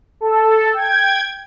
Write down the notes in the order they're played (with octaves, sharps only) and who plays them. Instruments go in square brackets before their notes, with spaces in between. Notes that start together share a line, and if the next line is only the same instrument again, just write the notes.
[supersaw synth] A4
G5 G#6